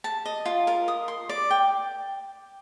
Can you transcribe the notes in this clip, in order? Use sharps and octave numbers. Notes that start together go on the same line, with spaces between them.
A5
D#5
F4
A#4
D#6
C6
D5
G5